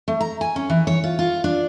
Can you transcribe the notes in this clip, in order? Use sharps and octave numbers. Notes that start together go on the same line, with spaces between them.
A3
A#5
G#5
C#4
E3
C#5
F4
F4
D4